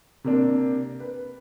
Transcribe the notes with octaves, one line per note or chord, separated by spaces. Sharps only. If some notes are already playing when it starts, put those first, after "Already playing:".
C3 A#3 D4
B4